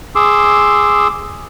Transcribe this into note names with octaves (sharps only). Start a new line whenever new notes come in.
G#4 C6 D6 E6